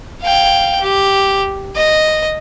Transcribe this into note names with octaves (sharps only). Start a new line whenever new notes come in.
F5 G5
G4
D#5